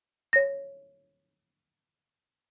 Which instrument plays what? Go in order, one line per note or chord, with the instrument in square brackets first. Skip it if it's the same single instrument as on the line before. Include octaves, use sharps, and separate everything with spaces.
[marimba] C#5 A#6